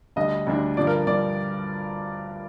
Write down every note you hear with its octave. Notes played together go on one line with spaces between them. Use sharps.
D2 D3 G3 D4 D#5
D2 D3 G3 D4
G2 D3 F3 D5
A#4
G2 D3 F3 D5